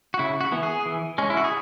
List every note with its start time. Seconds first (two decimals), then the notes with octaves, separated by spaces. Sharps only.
0.14 F#4
0.19 C#3 E4
0.41 F#4
0.52 E3 B3
0.63 G#4
0.86 E3
1.18 G#3 C#4
1.30 E4
1.37 F#4
1.44 G#4